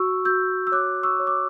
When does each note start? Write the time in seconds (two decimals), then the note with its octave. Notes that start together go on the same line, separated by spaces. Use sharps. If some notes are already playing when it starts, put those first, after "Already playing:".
Already playing: F#4 C#6 E6
0.25 F#4 E6 G6
0.67 E6
0.72 C#5 D6 F#6
1.03 C#6 E6
1.20 C#5
1.27 D6